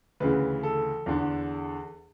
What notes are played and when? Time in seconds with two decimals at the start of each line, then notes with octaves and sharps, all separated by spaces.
0.20 D2 C#3 E3 B4
0.63 A4
1.06 E2 D3